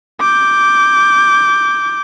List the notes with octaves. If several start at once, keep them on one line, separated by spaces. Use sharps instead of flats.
D6 G6